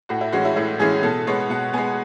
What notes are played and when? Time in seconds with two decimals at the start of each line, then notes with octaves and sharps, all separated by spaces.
0.09 A2 F#4
0.21 E4
0.32 E3 G#3 C#4 F#4
0.45 E4
0.56 A2 E4
0.80 E3 G#3 C#4 G#4
1.03 B2 A4
1.27 G#3 B3 C#5
1.50 B2 F#5
1.73 G#3 B3 G#5